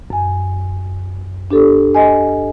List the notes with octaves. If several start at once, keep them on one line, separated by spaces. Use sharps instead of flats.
F#2 G#5
D4 G4 A4
D#5 G#5